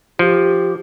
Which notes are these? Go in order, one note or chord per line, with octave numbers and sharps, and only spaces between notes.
F3 G4